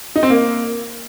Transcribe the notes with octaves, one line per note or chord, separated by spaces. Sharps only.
D#4
C4
A#3